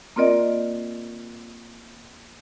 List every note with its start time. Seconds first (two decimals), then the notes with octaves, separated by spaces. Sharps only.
0.16 A#3 C4 F4 A#4 D5 D#5